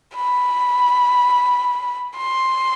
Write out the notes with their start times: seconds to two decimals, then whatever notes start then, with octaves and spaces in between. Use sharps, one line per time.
0.15 B5
2.18 C6